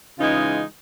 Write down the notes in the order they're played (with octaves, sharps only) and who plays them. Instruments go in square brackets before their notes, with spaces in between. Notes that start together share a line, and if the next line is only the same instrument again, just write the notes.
[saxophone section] C#3 E3 G#3 D#4 F4